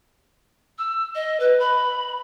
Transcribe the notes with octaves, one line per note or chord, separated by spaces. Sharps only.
E6
D#5
B4
B5